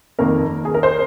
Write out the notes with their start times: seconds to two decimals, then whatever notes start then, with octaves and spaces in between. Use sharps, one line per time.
0.19 F2 D#3 A#3 A#4
0.65 G#4
0.74 A#4
0.83 C5